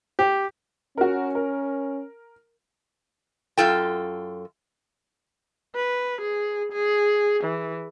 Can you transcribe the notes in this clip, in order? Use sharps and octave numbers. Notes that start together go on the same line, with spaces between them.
G4
C#4 F#4 A#4
A#4
F#2 F4 A4 G5
B4
G#4
G#4
E3